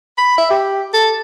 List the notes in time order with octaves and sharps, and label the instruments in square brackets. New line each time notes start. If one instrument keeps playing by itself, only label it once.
[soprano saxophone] B5
E5
G4
A4